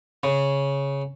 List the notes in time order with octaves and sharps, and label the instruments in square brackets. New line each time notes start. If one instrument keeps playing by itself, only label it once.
[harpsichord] C#3